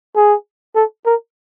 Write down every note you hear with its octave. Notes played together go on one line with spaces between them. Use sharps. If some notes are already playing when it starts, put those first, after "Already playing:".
G#4
A4
A#4